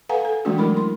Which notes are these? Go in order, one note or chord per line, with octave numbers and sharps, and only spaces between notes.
A4 B4 F5 F#5 G#5 A#5
A4
E3 G#3 A3 C#4 D4 F#4
F#3 E4 A#4 B5
C6